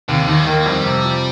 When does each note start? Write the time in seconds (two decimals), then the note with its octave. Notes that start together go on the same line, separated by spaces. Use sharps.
0.09 D#2 C3
0.21 F3
0.28 D#2 D#3
0.47 D#3 A#3
0.66 F2 G3
0.85 C3
1.04 F3